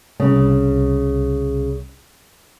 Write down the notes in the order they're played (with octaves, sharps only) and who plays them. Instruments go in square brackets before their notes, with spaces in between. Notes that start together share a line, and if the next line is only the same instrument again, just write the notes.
[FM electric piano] C2 [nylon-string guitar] C#3